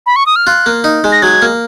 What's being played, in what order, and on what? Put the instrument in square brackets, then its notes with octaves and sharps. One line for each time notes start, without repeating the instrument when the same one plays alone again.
[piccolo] B5
C#6
D#6
F6
[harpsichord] F4 [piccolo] F#6
[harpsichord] A#3
D#4
G#3
[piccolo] A#6
[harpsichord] F#3 [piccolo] G#6
[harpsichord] A#3